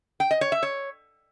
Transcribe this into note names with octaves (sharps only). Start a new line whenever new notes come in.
G5
D#5
C#5
E5
C#5